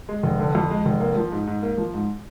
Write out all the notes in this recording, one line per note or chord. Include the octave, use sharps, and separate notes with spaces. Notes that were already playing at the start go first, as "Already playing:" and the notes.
G#3
F1
D3
F2
G#3
F1
A#3
F3
G#2
G#2
A#3
F3
G#2